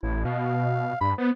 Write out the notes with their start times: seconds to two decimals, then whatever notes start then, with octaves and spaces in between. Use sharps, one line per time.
0.03 A1 E4
0.25 B2 F5
1.01 G2 B5
1.18 B3 C5